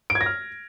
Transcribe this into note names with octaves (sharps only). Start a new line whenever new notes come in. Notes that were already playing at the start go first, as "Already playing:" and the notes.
D7
G#6
A#6
F6